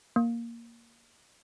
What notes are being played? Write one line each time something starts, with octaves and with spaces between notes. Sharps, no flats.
A#3